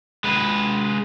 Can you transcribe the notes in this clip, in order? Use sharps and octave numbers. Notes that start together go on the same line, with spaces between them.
G#3 B4